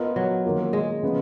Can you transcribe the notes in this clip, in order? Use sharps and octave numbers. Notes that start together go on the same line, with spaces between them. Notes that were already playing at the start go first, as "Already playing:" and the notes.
Already playing: B3 F4 A#4 D#5
F#3
D#3 A#3 F4
G#3
C#3 F3 B3 F4